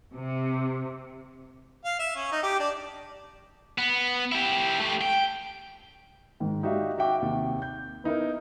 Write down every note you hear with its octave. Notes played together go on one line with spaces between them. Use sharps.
C3
F5
E5
C#4
D#4
G4
D4
B3
E4 G4
A3 G4
G5
G#2 D#3
D#4 F#4 G4 D5 E5 F5
F#4 E5 F#5 G5 D6
D#2 C3
G6
B3 D#4 E4 A#4